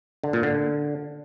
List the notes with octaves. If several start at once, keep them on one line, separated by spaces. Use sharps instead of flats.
D3
A#2
D3